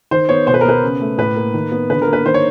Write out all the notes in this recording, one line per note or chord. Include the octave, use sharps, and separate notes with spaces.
D#3 C5
B3 C#5
B2 C5
B4
A#4
B3 B4
C#3
A3
A2 B4
A#3
D#3
B3
D3 B4
A#4
A#3
B4
D#3 C5
C#5